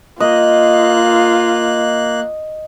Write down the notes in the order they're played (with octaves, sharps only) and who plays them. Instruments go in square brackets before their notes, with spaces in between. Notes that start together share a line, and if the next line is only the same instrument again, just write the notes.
[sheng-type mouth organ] A#3 F#6 [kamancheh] F4 [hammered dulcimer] D#5